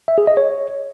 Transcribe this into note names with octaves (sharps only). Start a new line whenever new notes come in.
E5
G#4
D#5
C#5